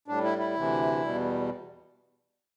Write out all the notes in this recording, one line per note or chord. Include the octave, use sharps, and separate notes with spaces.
A2 G3 D4
E4
E4
D2 C3 E3
E2 B2 G3